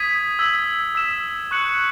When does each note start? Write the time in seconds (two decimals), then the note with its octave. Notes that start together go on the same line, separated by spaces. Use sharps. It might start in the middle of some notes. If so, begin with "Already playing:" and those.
Already playing: D#6 G#6 B6 D#7
0.39 E6 G#6 B6 F#7
0.95 E6 B6 E7
1.51 C#6 F#6 C#7 F#7